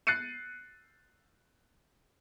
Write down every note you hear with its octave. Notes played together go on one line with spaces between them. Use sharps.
F#6 A6 C7 C#7 D#7